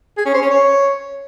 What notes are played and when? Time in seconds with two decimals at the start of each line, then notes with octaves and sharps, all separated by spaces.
0.17 G#4
0.26 C#4
0.34 C5
0.42 C#4
0.50 C#5